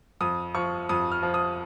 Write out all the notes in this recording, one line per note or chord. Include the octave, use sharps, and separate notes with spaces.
F2 D#6
F3 C#6
F2 D#6
F6
F3
D#6